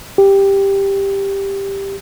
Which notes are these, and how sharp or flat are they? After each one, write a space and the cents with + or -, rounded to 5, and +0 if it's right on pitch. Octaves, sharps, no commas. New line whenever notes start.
G4 +5